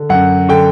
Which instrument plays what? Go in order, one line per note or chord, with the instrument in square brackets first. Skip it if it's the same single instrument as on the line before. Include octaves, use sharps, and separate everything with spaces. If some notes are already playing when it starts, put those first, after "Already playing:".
Already playing: [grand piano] D3
F#2 F#5
D3 G5